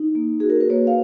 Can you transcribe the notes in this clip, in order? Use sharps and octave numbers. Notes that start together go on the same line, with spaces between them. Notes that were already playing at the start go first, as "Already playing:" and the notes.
Already playing: D#4
A#3
F#4 G#4
A#4
B4
A#3 C#5
F5